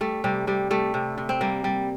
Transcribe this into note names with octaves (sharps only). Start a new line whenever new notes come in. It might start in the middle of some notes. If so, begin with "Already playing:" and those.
G3 A3
C3 G3
C3 G3
G3 A3
C3
C3
C4
G3 A#3
G3